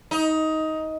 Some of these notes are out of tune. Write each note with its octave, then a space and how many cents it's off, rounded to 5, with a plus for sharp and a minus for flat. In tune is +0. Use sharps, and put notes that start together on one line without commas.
D#4 +15